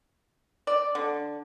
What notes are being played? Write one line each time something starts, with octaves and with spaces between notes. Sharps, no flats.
D5
D3